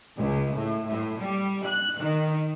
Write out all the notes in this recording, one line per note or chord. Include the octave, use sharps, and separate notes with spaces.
C#2
A2
A2
G3
F#6
D#3